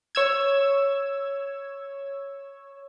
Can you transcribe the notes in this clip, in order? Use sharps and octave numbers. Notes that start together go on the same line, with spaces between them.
C#5 E6 G#6